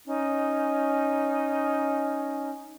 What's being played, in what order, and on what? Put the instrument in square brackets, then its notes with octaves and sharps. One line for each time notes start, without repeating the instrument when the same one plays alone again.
[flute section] C#4 D#4